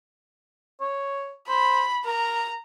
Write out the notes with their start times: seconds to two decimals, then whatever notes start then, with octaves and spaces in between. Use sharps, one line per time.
0.81 C#5
1.49 C5 B5
2.05 A#4 A#5